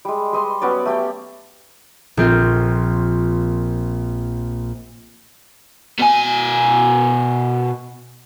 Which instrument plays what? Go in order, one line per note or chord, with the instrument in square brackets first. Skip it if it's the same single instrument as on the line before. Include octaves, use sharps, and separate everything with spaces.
[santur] G3 G#3
G3 D#5 C6
F#3 B3 C#4 D5
A3 G4 G5
[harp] A#1 C4 F4
[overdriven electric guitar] B2 G#5